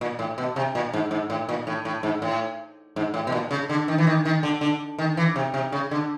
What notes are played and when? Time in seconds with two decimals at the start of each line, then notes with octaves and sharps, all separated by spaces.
0.01 A#2
0.19 A2
0.38 B2
0.56 C3
0.75 A#2
0.93 G#2
1.11 G#2
1.30 A2
1.49 A#2
1.67 A2
1.85 A2
2.03 G#2
2.22 A2
2.96 G#2
3.14 A2
3.27 B2
3.32 A#2
3.51 C#3
3.69 D3
3.88 D#3
3.98 E3
4.07 D#3
4.25 D#3
4.43 D3
4.61 D3
4.99 D#3
5.17 E3
5.36 C3
5.54 C3
5.72 C#3
5.91 D3